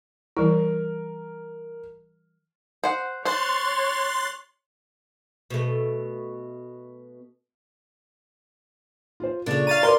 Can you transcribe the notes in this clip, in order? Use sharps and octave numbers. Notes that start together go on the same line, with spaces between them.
E3 G3 E4 A#4
C5 F#5
C5 C#5 C6 F#6 A6
B2 A3
F4 C5
A#2 C#3 D4 A4 C#5
F5 A#5 A6 D#7
A#4 D5 C6